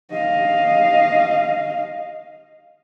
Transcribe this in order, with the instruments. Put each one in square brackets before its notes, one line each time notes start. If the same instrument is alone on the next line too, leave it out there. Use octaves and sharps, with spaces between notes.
[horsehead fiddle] D#5 F5